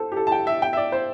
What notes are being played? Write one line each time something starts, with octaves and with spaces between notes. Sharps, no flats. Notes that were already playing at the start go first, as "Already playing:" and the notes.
Already playing: A4 C5
G4
A4
A5
G5
E5
G5
E5
D5
C5